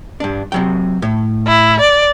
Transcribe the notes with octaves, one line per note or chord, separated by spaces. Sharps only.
G2 D4
C3 F#3 G5
A2
E4
D5